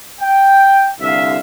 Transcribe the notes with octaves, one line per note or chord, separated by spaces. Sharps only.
G5
C2 D3 E5 F5